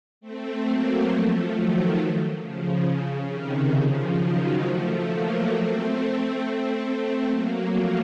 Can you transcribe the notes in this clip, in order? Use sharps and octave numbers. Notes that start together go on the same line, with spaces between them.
A3 C4
F#3 A#3
F3 A3
D#3 F#3
C#3 F3
C#3
C3 D#3
C#3 F3
D#3 F#3
F3 A3
F#3 A#3
A3 C4
A3 C4
F#3 A#3
F3 A3